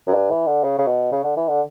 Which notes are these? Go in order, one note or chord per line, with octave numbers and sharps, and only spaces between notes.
F#2
G2
E3
D3
C#3
C#3
B2
C#3
D3
E3
D3